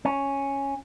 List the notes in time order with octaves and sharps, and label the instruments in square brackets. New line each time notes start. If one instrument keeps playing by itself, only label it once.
[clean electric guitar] C#4